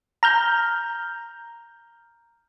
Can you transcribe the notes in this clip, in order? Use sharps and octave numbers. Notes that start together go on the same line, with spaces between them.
A#5 F6 G6